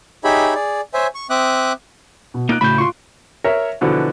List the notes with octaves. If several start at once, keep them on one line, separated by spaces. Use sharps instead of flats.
D#4 G4 G#4 C#5 E5 B5
G#4 D5
C5 C#5 E5 G#5
C#6
C4 E5 D6 D#6 F#6
B2
A#3 D#4 F4 F#6 D7
A2 C#3 A3 F#4 B5 G6
F4 C6 C#6
A#4 C#5 E5
B2 D3 E3 F3 B3